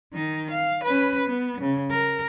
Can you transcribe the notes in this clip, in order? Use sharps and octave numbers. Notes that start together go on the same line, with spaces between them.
D#3 D#4
F5
C#4 B4
B3
C#3
A#4